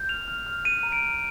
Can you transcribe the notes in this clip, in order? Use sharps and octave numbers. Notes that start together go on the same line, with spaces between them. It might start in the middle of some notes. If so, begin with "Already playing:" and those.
Already playing: G6
F6 F7
F6
F6
F6 D#7
A#5
D7
F6